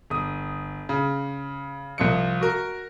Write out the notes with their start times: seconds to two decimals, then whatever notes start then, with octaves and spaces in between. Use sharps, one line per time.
0.10 G1 D#6
0.89 C#3
1.98 C2 F3 C#7
2.41 F#4 A#4